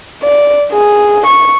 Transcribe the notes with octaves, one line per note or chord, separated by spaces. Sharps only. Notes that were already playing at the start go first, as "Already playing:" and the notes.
D5
G#4
C#6